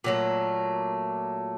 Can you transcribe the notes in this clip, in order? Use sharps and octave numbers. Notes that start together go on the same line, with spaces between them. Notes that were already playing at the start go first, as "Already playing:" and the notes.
A#2 F#3 A3